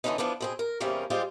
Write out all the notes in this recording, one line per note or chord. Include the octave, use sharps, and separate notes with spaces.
D3 E3 G3 B3 C#4 D#4
E3 F3 B3 D4
B2 C4 G#4
A#4
E2 C3 G3 A#3 C#4
G3 G#3 F4 G4 C5